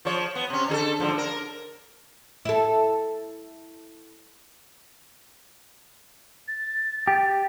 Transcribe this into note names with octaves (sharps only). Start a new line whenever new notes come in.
F3 C#5
B3
C3 C#4
D3 G#4 A4
G#2 D3 F3
A#4
E4 A4
A6
G4